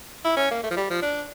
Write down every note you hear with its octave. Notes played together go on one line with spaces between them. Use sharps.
E4
C#4
A#3
A3
F3
G3
F3
D4